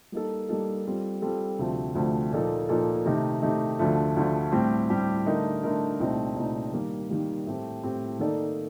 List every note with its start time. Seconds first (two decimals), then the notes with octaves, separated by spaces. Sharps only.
0.12 G3 A#3 D#4 A4
0.49 G3 A#3 D#4 A4
0.86 G3 C4 F4 A4
1.22 G3 C4 F4 A4
1.59 D2 C3 F3 A3 C4
1.95 D2 C3 F3 A3 C4
2.32 A#2 F3 A#3 D#4 A4
2.69 A#2 F3 A#3 D#4 A4
3.06 C3 D#3 A3 D#4
3.42 C3 D#3 A3 D#4
3.79 D2 D3 F3 A3
4.16 D2 D3 F3 A3
4.52 A2 G3 C4 G4
4.90 A2 G3 C4 G4
5.26 D3 A3 D#4 A#4
5.63 D3 A3 D#4 A#4
6.00 C2 A#2 A3 C4 D#4
6.36 C2 A#2 A3 C4 D#4
6.74 D#3 G3 A#3
7.09 D#3 G3 A#3
7.47 A2 A3 C4 G4
7.83 A2 A3 C4 G4
8.19 D#3 A#3 D#4 A4 D5